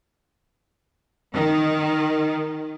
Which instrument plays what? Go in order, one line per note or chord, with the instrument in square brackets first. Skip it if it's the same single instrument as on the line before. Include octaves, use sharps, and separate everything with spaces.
[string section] D#3